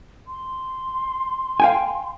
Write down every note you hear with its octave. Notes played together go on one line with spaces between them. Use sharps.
C6
F5 G5 G#5